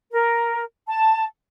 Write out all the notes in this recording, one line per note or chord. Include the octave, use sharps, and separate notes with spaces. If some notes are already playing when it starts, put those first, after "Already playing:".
A#4
A5